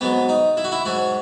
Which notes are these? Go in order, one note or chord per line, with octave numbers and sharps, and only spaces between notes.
G#2 F#3 B3
D#4
E4
F#4
E4
G#2 F#3 F#4